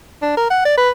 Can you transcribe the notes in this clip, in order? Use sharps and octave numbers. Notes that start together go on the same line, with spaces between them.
D4
A#4
F#5
D5
B4